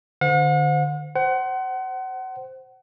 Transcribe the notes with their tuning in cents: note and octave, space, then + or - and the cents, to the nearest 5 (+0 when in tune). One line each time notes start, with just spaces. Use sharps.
D3 +25 C5 -25 F#5 -45
C5 +0 F#5 +30